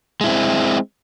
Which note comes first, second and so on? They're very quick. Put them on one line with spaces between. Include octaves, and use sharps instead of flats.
G#3 E4 C4